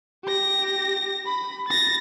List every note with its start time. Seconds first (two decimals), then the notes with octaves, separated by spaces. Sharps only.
0.24 G4 A#6
1.26 B5
1.68 A6 A#6